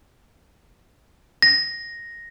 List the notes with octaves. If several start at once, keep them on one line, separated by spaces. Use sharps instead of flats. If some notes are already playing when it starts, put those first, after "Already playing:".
A#6